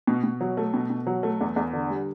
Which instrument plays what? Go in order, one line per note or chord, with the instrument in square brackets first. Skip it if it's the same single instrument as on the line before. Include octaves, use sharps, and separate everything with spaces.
[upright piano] B2
B2
F#3
A3
B2
B2
F#3
A3
E2
E2
D3
G3